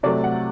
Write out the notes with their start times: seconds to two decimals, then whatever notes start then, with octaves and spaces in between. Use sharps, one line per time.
0.03 C3 F#3 A3 D5
0.24 F#5